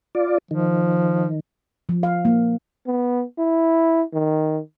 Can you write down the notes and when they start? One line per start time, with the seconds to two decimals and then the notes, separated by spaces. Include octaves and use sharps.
0.15 F4 D5
0.51 D#3 F3
1.89 F3
2.03 F5
2.25 A#3
2.86 B3
3.38 E4
4.13 D#3